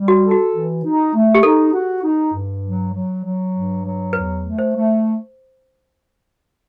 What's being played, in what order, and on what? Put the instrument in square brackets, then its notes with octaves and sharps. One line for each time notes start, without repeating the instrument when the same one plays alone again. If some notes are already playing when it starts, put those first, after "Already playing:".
Already playing: [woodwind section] G3
[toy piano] F#4
[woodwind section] A4
[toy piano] F#4
[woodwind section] E3
D#4
A3
[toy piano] G4
[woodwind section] D#4 [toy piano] A4
[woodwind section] F#4
D#4
G2
F#3
F#3
F#3
G2
F#3
[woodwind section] E2 [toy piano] B4
[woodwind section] A3
[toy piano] C5
[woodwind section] A3